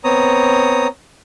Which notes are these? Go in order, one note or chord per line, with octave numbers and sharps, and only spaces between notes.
B3 C4 C#5 A#5 D#6